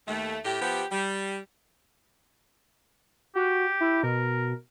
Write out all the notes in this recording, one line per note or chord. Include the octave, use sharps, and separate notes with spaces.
D#2 A3
A2 G4
F3 B3 G4
G3
F#4 G4
E4
B2 A#4